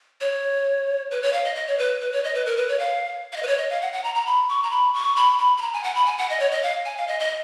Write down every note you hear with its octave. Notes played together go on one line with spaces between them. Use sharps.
C#5
B4
C#5
F5
D#5
D#5
C#5
B4
B4
C#5
D#5
B4
A#4
B4
C#5
F5
F5
D#5
B4
C#5
D#5
F5
F#5
F#5
A#5
A#5
B5
C#6
A#5
B5
C#6
B5
B5
B5
A#5
G#5
F#5
B5
G#5
F#5
D#5
C#5
D#5
F5
G#5
F5
D#5
D#5